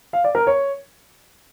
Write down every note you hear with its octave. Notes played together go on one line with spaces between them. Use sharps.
F5
D5
A#4
C#5